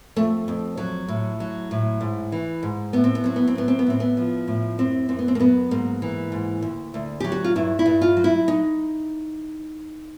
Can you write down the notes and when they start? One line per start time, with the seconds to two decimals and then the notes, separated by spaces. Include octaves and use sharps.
0.16 F2 A3
0.48 F2
0.77 F#3
1.08 A2
1.40 F#3
1.71 A2
2.01 G#2
2.32 E3
2.63 G#2
2.93 A2 B3
3.04 C4
3.15 B3
3.24 F#3 C4
3.36 B3
3.48 C4
3.55 A2 B3
3.68 C4
3.79 B3
3.87 A2 C4
4.00 B3
4.17 F3
4.48 A2
4.78 F#2 C4
5.09 F#2 C4
5.19 B3
5.28 C4
5.35 A#3
5.40 F#3 B3
5.71 G#2 A#3
6.02 E3
6.32 G#2
6.62 D2
6.94 D2
7.20 F#3 G4
7.32 F#4
7.44 F4
7.56 G2 E4
7.79 E4
7.86 G2
8.01 F4
8.17 F#3
8.24 E4
8.48 D#4